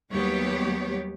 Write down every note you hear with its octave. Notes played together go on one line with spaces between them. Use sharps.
D#2 F#3 G3 B3 G4 C#5